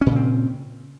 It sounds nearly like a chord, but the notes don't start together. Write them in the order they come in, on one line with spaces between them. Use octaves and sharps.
C#4 A#2 C#3 C4